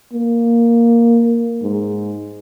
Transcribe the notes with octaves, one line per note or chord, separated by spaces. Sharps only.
A#3
G#2